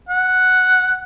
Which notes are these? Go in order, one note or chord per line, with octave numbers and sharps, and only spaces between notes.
F#5